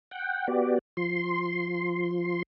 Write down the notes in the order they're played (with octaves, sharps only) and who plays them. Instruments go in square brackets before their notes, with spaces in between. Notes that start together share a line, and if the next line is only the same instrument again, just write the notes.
[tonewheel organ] F#5 G5
B3 F#4 G4 D5
F3 C6